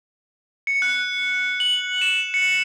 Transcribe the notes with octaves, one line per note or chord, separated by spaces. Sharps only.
C#7
F#6
F#7
E7
C#7